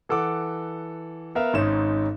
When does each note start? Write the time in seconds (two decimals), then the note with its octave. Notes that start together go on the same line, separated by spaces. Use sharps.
0.09 E3 A4 F#5 D6
1.35 B3 A#4 E5 F5
1.53 G#1 G#2 C#4 D#4 E7